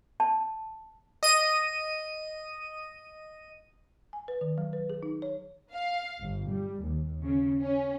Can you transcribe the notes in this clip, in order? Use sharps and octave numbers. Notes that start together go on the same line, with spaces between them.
A5
D#5 D#7
G#5
B4
D#3
F#3
B4
G#4
D#4
C#5
F5
G1
G3
D#2
C#3
C#4